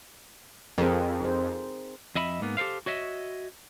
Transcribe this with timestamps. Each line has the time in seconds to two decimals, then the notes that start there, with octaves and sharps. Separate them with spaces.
0.78 F2 C4 G#4 A#4
1.20 D#4 G#4 C5
2.15 F2 D#5 E5 B5
2.41 G#2 A#3 B3
2.57 G4 A4 A#4 C5 F5
2.86 F#4 C#5 D#5 E5